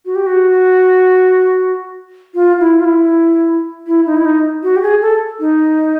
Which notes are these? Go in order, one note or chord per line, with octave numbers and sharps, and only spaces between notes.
F#4
G4
F#4
F4
E4
F4
E4
E4
D#4
E4
D#4
F#4
G4
G#4
A4
D#4